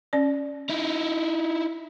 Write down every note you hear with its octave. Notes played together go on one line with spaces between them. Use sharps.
C#4 D5
D#4 E4